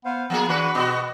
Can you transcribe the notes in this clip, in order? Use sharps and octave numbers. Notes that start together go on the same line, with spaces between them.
B3 C5 F5
F3 A#3 B3 G#4 A5
E3 D4 F#4 B4 B5 C6
B2 B3 F#4 G4 D#5